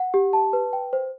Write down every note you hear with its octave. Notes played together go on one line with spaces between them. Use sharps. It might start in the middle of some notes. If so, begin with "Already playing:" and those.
Already playing: F#5
G4
A5
B4
G5
C5